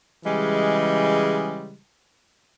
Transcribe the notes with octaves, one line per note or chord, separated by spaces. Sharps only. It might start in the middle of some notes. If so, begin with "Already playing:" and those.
C#3 E3 G3 G#3